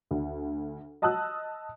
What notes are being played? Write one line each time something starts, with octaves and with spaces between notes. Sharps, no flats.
D2
D#5 A5 D#6 E6 F#6